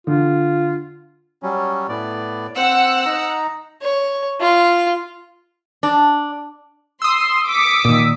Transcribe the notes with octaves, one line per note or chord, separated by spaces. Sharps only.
D3 F4
F#3 G3 C#4
A2 B3 D5
C4 C5 F#5 E6
D#4 A#5
C#5
F4
D4
C6 D#6 E6
D6 B6 C#7
A#2 D#3